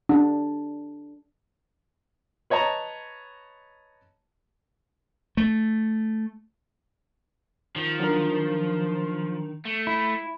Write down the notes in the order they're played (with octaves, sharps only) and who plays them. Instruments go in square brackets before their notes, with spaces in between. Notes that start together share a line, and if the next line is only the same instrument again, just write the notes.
[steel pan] D4
[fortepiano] B4 C#5 D#5 A5 A#5
[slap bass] A3
[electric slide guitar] D#3 [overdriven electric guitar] F3
[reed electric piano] F#3 D4 A#4
[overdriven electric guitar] A3
[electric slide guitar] E4 [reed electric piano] B5